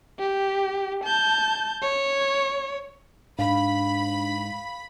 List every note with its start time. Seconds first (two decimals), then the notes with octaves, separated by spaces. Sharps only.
0.19 G4
1.04 A5 G6
1.82 C#5
3.39 G#2 D4 F5 B5